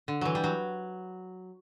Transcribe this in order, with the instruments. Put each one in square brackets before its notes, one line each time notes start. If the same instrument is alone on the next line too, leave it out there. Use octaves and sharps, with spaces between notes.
[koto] D3
E3 F#3
G3
F#3